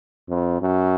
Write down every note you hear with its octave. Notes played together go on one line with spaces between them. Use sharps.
F2
F#2